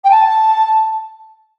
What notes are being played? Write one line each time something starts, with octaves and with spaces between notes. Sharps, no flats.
G5
A5